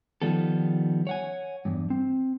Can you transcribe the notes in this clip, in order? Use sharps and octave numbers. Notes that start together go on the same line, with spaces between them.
D#3 F3 G3 B3 A4
C#5 F#5 G#5
E2 G2
C4